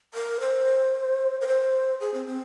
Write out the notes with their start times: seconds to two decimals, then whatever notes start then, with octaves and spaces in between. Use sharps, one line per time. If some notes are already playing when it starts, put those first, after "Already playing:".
0.14 A#4
0.40 C5
1.41 A#4
1.47 C5
2.00 G#4
2.14 C4
2.27 C4